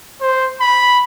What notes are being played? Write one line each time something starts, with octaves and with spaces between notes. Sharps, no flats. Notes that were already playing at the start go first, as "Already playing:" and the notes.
C5
B5